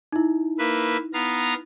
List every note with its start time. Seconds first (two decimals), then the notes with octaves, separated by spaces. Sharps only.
0.12 D#4 E4
0.59 A#3 B4 E5
1.14 B3 F5 A#5